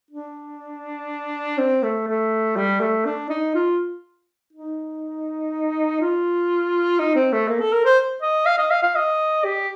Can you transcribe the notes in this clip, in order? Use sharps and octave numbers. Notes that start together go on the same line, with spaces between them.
D4
C4
A3
A3
G3
A3
D4
D#4
F4
D#4
F4
D#4
C4
A3
A#3
A4
A#4
C5
D#5
F5
D#5
F5
F5
D#5
G4